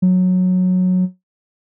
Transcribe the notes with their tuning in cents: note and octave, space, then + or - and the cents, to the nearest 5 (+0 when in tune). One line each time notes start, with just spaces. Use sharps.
F#3 -15